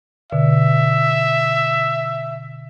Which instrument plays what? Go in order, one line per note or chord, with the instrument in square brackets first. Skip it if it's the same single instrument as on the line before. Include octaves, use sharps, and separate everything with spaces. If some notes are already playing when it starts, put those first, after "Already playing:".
[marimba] B2 D3 [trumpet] E5